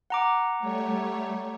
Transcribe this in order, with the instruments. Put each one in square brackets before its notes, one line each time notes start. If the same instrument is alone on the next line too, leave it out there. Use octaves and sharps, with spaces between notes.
[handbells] F#5 A#5 D6
[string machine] G3 A3 C#5